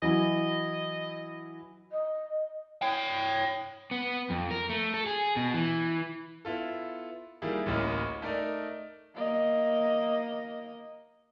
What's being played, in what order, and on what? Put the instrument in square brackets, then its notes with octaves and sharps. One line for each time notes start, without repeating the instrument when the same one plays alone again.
[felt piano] E3 F#3 E4 [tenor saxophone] D#5
[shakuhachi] D#5
[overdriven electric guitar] C#5 G5
[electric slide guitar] B3
F2
A#4
A3
A4
G#4
B2
E3
[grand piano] B3 E4 F4 A4
D#3 G3 A#3 E4 G#4
A1 D2 A2 A#3 D#5 F6
A3 D#4 A#4 D5 D#5
[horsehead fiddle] A#3 D#5